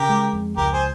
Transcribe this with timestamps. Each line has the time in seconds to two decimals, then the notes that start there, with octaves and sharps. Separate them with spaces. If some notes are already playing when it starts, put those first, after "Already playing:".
Already playing: C#3 G4 A#4
0.09 G#3
0.33 F2
0.57 C#2 G4 A#4
0.72 G#4 C5